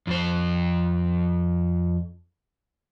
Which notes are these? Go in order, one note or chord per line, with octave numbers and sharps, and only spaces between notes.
F2 C5